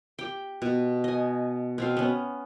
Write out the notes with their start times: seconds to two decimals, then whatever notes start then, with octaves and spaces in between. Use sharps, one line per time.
0.19 G4 G5
0.62 B2
1.04 D#5 G#5
1.78 B2 C4 F5
1.97 B3 C#4